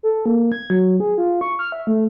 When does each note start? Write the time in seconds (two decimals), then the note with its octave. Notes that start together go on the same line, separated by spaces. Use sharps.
0.03 A4
0.26 A#3
0.52 G#6
0.70 F#3
1.00 G#4
1.18 F4
1.41 C#6
1.59 F6
1.72 E5
1.87 A3